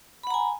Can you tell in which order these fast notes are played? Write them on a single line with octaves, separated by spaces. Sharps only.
B5 F#5 A#5 G#5